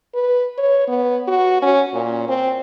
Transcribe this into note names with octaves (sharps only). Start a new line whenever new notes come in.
B4
C#5
B3
F#4
C#4
A#2
C4